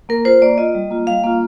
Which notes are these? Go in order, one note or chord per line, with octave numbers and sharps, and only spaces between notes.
A#3 A#4
F4 C5
A#3 D5
F4 D#5
G3
A#3 F4
G3 F5
A#3 F4